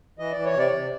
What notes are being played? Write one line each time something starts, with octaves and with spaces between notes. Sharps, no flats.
E3 D#5
E3 D5
C#5
C3 D5
C3